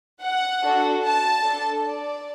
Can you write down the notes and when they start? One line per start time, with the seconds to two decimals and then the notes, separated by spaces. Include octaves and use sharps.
0.23 F#5
0.63 D4 F#4 A4
1.05 A5
1.45 D4 A4
1.86 D5